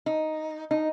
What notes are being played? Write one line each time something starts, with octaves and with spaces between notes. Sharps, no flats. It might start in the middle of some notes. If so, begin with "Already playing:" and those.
D#4
D#4